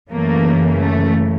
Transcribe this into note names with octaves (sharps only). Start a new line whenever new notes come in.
F#2 C#3 E3 A3 A#3
A3